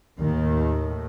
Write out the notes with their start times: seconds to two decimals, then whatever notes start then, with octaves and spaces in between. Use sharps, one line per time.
0.20 D#2 A2 D#3